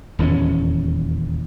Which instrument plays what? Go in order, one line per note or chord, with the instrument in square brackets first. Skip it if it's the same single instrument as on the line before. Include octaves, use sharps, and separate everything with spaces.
[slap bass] D#1 E2 E3 C#4